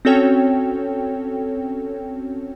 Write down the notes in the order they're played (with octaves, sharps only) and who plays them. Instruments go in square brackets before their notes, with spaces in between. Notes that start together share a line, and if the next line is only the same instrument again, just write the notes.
[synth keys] C4 C#4 F#4 A4 C#5 G5